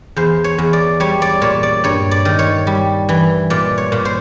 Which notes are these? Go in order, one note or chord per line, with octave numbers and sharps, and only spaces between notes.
E2 C5
C#5
E2
D5
G3 C#5
D5
A#2 C#5
D5
G2 C#5
D5
D#3
C#5
G3
E3
A#2 D5
C#5
A#2
C5